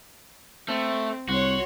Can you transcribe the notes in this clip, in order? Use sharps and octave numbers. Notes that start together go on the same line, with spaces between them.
A3 C4
C2 F#4 C#5 C6